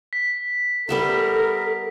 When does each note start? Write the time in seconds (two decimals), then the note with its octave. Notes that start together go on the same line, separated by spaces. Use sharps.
0.13 B6
0.89 G3 B3 A4 A#4 E5